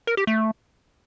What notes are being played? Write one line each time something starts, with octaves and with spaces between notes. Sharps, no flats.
A#4
G4
A3